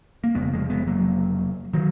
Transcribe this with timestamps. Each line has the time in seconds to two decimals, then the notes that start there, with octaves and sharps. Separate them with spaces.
0.24 A#3
0.35 F1 F2 C#3 G#3 B3
0.53 F3 G#3
0.70 G#3 B3
0.87 F#3 A#3
1.73 D#3 F#3